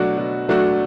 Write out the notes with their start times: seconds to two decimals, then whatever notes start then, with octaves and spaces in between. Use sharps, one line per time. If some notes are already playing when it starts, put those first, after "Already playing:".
Already playing: B2 F#3 A3 D4 F#4
0.17 B2
0.48 F#3 A3 D4 F#4